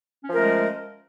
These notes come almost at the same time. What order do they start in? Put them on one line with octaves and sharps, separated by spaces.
C#4 F3 A#4 A3 G#3